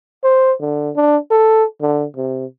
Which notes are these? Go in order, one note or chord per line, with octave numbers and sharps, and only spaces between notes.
C5
D3
D4
A4
D3
C3